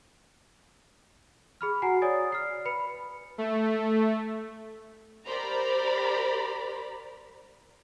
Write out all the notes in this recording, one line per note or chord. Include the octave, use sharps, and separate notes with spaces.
G#4 B5 F6
F#4 F#5 G#5 A#5 C7
C#5 D5 G#5 D#6 A6
F6 C7
B4 B5 C#7
A3
G4 A#4 C5 D5 A#5 B5